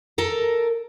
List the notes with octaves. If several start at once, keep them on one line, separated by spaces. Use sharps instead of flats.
A4 A#4 A#5